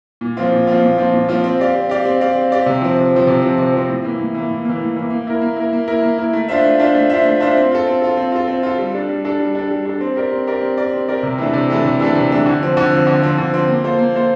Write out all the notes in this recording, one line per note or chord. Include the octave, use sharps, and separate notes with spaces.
A#2
F3 C4 F4
A#2
F3 C4 F4
A#2
F3 C4 F4
A#2
F3 C4 F4
C4
G4 D5 F5
C4
G4 D5 F5
C4
G4 D5 F5
C4
G4 D5 F5
C3
F3 C4
C3
F3 C4
C3
F3 C4
C3
F3 C4
A2
E3 A#3
A2
E3 A#3
A2
E3 A#3
A2
E3 A#3
A#3
E4 A#4
A#3
E4 A#4
A#3
E4 A#4
A#3
E4 A#4
A3
D4 F4 C5 E5
A3
D4 F4 C5 E5
A3
D4 F4 C5 E5
A3
D4 F4 C5 E5
C4
F4 A4
C4
F4 A4
C4
F4 A4
C4
F4 A4
G3
D4 A4
G3
D4 A4
G3
D4 A4
G3
D4 A4
C4
G4 A#4 D5
C4
G4 A#4 D5
C4
G4 A#4 D5
C4
G4 A#4 D5
C3
E3 A3 D4 A4
C3
E3 A3 D4 A4
C3
E3 A3 D4 A4
C3
E3 A3 D4 A4
D3
F3 C4
D3
F3 C4
D3
F3 C4
D3
F3 C4
A#3
F4 A4 C5
A#3
F4 A4 C5